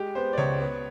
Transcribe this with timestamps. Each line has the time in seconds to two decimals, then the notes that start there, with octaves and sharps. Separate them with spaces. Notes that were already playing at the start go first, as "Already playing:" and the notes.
Already playing: G#3 G4
0.15 B3 C5
0.33 D5
0.38 C#2 C#5
0.60 B3